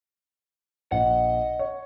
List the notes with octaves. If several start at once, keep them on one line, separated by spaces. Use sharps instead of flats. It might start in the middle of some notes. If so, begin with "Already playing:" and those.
A#1 D#5 F#5
C#5